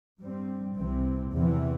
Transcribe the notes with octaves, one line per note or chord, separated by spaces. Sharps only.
G2 G3 C4
C2 C3 E3 C4
E2 C3 E3